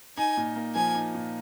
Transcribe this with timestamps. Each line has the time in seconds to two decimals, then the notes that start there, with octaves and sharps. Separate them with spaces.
0.17 D#4 G#5
0.37 A#2
0.56 A#3
0.75 F3 G#5
0.95 D#4
1.15 A#2